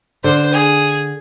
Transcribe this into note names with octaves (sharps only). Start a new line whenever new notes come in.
D3 C5
G#4